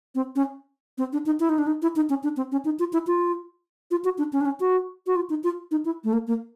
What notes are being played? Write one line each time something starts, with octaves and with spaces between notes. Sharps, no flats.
C4
C#4
C4
D4
D#4
E4
D#4
D4
D#4
E4
D#4
C#4
D4
C4
C#4
D#4
F4
E4
F4
F4
F#4
D4
C#4
D4
C#4
F#4
F#4
F4
D#4
F4
D#4
E4
A3
A#3
A#3